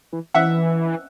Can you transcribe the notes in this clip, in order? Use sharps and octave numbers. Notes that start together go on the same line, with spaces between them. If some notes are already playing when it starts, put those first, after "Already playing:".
E3
E3 E5 F#5